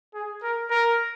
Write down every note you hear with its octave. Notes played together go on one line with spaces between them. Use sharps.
G#4
A#4
A#4